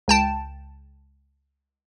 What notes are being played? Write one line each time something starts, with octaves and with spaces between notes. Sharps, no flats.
C#2 G5 A5